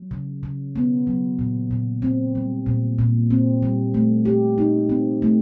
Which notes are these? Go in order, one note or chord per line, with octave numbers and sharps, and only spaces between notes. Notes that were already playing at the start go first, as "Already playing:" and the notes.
Already playing: F#3
C#3
C#3
B3
F#3
A#2
A#2
C4
G3
A#2
A#2
C4
G3
A3
G4
D#4
C4
A3